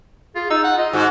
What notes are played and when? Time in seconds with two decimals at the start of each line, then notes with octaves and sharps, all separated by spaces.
0.35 F4 G#4
0.50 D#4 E6
0.64 F#5
0.78 F4 D#5
0.93 G#2 F#4